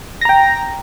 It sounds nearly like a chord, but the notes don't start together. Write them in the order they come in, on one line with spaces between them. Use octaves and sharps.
A#6 A#5 G5